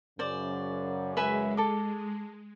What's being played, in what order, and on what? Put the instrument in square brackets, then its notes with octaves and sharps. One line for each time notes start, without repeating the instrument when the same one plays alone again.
[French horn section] F#2 C#3 [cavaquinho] C5 D5
[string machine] G#3 [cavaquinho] B4 E5 G#5
[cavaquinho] A4 D6